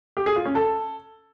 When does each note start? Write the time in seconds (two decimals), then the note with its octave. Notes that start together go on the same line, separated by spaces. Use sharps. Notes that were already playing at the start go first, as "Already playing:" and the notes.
0.17 G4
0.26 G#4
0.36 F4
0.45 C#4
0.55 A4